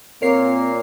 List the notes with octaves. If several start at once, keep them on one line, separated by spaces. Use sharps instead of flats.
A#2 C4 A#4 C#5 C7